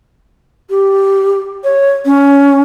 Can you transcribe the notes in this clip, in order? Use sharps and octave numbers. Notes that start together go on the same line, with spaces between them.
G4
C#5
C#4